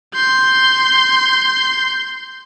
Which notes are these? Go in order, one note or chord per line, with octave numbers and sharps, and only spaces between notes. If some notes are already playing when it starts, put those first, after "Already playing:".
C6 G6